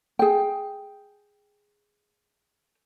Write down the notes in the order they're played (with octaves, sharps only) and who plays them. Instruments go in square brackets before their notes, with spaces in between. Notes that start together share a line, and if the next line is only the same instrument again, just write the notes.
[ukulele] G#4 G5